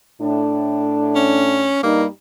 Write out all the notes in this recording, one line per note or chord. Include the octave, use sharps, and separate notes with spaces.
A2 D4
C#4
G2 G3 A#3 D#4